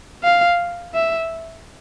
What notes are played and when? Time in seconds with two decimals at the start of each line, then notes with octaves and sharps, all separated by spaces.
0.24 F5
0.94 E5